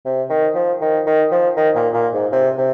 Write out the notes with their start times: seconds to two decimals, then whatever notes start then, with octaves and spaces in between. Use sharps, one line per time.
0.05 C3
0.30 D#3
0.55 F3
0.81 D#3
1.07 D#3
1.31 F3
1.57 D#3
1.75 A#2
1.94 A#2
2.13 G#2
2.32 C3
2.58 C3